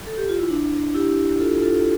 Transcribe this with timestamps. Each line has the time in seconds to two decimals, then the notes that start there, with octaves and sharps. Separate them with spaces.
0.07 A4
0.17 G4
0.29 F4
0.39 E4
0.50 D4
0.94 E4 G4
1.40 F4 A4
1.62 F4 A4